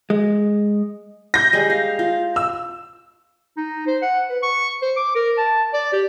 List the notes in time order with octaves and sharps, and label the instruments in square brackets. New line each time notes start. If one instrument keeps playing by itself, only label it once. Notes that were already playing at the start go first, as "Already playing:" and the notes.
[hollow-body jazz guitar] G#3
[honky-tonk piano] G6 A#6
[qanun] G3 G#3 D#5
F5
F4
[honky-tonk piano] E6
[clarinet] D#4
C5
F#5
B4
C#6
C5
D6
A#4
A5
D5
G4